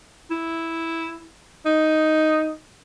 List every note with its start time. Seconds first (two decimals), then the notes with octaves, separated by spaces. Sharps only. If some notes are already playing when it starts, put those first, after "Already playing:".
0.31 E4
1.65 D#4